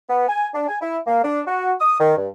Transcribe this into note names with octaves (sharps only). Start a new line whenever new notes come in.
B3
G#5
D4
G#5
E4
A#3
D4
F#4
D#6
D#3
G2